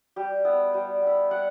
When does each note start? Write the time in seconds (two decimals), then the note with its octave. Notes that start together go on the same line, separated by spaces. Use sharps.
0.16 G3 G4
0.45 B3 E4
0.74 G3
1.02 B3 E4
1.30 G3 F#5